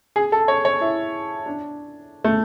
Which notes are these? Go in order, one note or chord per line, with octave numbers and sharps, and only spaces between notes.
G#4
A4
C#5
C#5
E4
D4
A3